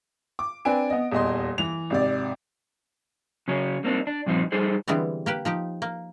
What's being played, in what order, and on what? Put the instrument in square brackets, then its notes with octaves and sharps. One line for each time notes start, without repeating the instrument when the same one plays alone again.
[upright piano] D6
C4 D4 B4 G#5 D7
B3 D#5
D#1 E2 D#5 C6
E3 F7
G#1 C3 D5
[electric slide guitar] C#3 F#3 C#4
G3 A#3 C4 D4 D#4
D4
G2 A#2 F3 C4 D#4
G3 D#4 G#4 A4 C5
[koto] D3 E3 G3 G#3 B3 C4
A#3 G4 B4
F3 D#4 G4
A#3